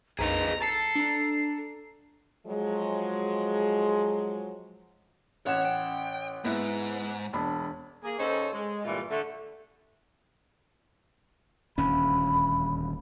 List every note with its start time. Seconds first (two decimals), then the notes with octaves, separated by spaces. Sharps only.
0.19 A#1 F2 D#4 G#4 B4 D#5 A#5
0.62 A4 A5 A6 C7
0.96 D4 A#5
2.46 F3 F#3 G#3
5.46 A1 C#4 C#5 F#5 E7
5.65 G5
6.44 G#2 B3 E4
7.33 E1 D4 B5
8.04 A#3 G#4
8.19 D#2 C#4 D#4 A4 C5 C#5
8.52 G#3
8.85 G2 A#2 E3 G3 A3 F4
9.10 D3 A3
11.78 D#1 D2 C#4 B5